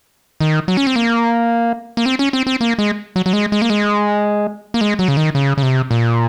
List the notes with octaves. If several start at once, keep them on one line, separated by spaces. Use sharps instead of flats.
D#3
F#3
C#4
C4
A#3
A#3
C4
C#4
C4
C4
A#3
G#3
F#3
F#3
G#3
G#3
A#3
G#3
A#3
G#3
F#3
C#3
D#3
C#3
C#3
C3
A#2